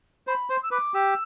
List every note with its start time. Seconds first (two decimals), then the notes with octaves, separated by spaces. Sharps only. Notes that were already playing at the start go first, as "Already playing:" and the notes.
0.27 C5 B5
0.49 C5 C6
0.62 E6
0.71 B4 D6
0.94 G4 E6